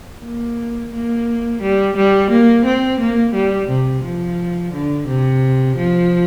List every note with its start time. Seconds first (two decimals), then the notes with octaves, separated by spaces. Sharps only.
0.24 A#3
0.93 A#3
1.62 G3
1.97 G3
2.31 A#3
2.65 C4
3.01 A#3
3.35 G3
3.69 C3
4.04 F3
4.73 D3
5.08 C3
5.77 F3